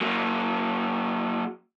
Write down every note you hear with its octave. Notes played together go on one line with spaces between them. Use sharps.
F#3 A#3